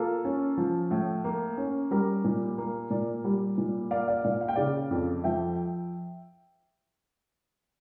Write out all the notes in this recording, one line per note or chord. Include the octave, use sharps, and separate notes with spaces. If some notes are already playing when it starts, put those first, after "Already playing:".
Already playing: A#3 F4 A4
C#4
F3
A2
A#3
C#4
G3 G4 A#4
A#2
A#3
A#2 A#4 D5
G3
A#2
A#3 D5 F5
D5 F5
A#2 D5 F5
F5
G5
C#3 D5 F5
F2
F3 E5 G5